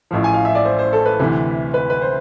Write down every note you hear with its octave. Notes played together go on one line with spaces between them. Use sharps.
A1 A2 F3
G#5
F5
E5
D5
C5
C5
A4
B4
D2 C3 E3
B4
B4
C5